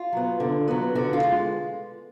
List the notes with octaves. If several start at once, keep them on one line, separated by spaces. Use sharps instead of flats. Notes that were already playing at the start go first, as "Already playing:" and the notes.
Already playing: F4
F#3 B3
D3
F#3 B3
D3 F#4
F4
G#3